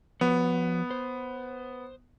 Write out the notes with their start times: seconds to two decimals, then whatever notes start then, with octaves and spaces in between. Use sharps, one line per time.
0.21 F3 B3 F#4 C#5
0.91 C5